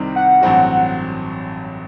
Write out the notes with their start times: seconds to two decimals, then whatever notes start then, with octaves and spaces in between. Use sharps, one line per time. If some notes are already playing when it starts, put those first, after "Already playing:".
Already playing: C2 C3 D#3 G3 C4
0.16 F#5
0.42 A1 G2 F#3 C4 F#4